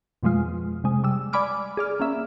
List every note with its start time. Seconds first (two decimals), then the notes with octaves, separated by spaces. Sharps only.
0.23 F2 B2 F3 G#3 F4
0.84 C3 G#3
1.04 G3 E6
1.33 D5 G#5 B5 D6 F6
1.77 G#4 D5 F6
2.00 A#3 C#4 E5